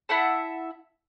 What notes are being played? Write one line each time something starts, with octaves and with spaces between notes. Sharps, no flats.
E4 E5 F#5 A5